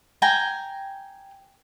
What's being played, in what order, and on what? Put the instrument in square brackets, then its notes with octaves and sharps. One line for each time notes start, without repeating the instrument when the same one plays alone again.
[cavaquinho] G5 G#5 A#5